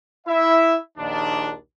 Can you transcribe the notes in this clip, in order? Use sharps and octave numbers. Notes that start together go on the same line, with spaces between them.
E4 E5
A#1 D#2 D#3 D4